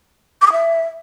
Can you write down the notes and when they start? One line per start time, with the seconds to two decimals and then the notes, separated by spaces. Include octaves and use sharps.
0.41 D6
0.47 D#6
0.52 E5